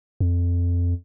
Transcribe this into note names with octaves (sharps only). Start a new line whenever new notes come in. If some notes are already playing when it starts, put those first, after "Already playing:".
F2